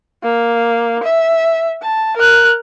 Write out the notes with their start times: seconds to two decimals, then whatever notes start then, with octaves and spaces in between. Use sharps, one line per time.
0.23 A#3
1.03 E5
1.83 A5
2.17 A#4 F#6